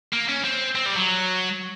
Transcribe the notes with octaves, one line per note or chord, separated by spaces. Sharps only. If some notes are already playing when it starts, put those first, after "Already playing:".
A#3
C#4
C4
C4
G3
F#3